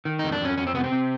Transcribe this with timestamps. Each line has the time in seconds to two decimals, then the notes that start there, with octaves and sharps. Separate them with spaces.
0.05 D#3
0.19 F2 D#4
0.32 D4
0.41 F2 C#4
0.58 F2 C#4
0.67 C4
0.75 C3 B3
0.84 C4
0.92 C3